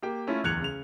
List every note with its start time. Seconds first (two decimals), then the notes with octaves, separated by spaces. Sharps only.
0.02 A#3 G4 G5
0.27 A3 C#4 E4 F4
0.43 D1 E2 F#6 G#6 C#7 F7
0.61 C#3 F7